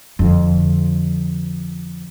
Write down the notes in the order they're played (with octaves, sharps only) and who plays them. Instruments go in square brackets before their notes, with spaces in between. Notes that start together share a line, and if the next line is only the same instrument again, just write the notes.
[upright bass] F2 D3